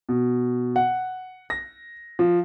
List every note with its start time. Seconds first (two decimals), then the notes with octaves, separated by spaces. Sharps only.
0.09 B2
0.76 F#5
1.50 A#6
2.19 F3